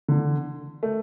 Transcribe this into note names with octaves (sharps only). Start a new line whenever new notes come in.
D3
A3